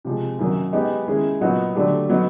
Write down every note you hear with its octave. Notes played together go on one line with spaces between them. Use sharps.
C3 F3 G#3
F#2 D#3 F#3 A#3
G#3 B3 D#4 G4
D#3 G#3 C#4 E4 G#4
A#2 F#3 B3 D#4 F#4
D3 F#3 A3 D4 G4
F#3 B3 D#4